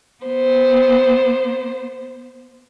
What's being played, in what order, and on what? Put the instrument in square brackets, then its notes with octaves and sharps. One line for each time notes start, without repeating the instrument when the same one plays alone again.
[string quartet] B3 C5